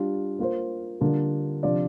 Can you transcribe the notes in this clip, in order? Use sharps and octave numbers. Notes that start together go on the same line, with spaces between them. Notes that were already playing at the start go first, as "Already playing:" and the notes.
Already playing: G3 D4 F4
A#3 F4 C5
D3 G3 A#3 D4 F4
C3 F3 D4 F4 D5